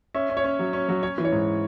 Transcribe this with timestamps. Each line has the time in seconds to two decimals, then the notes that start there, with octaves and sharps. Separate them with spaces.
0.14 C#4 E5
0.30 C#4
0.37 C#5
0.44 C#4
0.59 F#3
0.73 C#4
0.89 F#3
1.02 C#4 C#5
1.18 E3
1.25 C#5
1.32 G#2